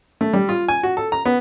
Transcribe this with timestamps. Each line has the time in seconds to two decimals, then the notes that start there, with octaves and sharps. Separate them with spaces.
0.21 A3
0.33 G3
0.49 F4
0.68 G#5
0.83 F#4
0.97 A4
1.12 A#5
1.26 B3